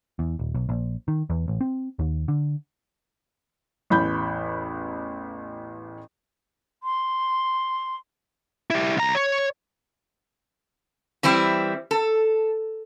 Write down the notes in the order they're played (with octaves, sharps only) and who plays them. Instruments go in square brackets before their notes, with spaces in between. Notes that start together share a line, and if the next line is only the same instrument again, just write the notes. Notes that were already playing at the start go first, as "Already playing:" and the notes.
[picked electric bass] E2
D#1
B1
A#1
D#3
E2
A1
C4
D#2
D3
[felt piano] A1 E2 B5 G6
[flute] C6
[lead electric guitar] E4 G4
C2 A#5
C#5
[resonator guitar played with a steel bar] E3 G3 C4 E4
A4